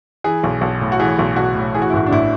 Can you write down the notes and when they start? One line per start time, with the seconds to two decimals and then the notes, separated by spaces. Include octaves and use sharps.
0.24 E3 G#4
0.43 B1
0.61 B1
0.81 A2
0.92 F#4
1.00 E3 G#4
1.19 B1
1.36 B1 F#4
1.55 A2
1.74 E3 G#4
1.82 F#4
1.90 E4
1.93 A1 F#4
2.07 D4
2.12 A1 E4